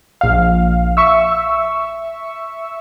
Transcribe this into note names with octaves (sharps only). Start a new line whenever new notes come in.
A#1 F5
E5 C#6 E6